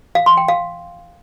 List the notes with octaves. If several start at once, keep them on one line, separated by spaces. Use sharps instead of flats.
F5
C6
G5
F5